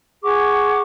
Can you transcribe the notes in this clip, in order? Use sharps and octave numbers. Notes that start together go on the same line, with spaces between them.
G#4 F#5 C#6 D6